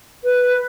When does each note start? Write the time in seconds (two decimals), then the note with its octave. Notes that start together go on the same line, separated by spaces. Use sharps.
0.24 B4